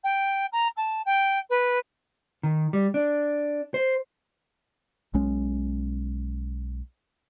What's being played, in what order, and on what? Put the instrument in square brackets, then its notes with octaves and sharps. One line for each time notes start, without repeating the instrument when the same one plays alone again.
[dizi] G5
A#5
A5
G5
B4
[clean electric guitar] D#3
G3
D4
C5
[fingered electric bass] B1 G#3 C#4